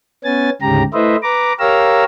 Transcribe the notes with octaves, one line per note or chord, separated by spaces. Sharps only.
B3 C#4 G#5 A6
D2 G#2 C#3 G4 A#5
A3 E4 B4 C5 D#5 E5
B4 A#5 D6
G4 A#4 C#5 F5 A#5 E6